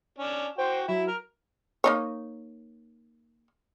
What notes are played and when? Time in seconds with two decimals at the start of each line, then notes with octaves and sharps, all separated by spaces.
0.19 C#4 D4
0.58 F#4 C5 G5
0.89 F#3 E4
1.08 A#4
1.84 A#3 D#4 C#5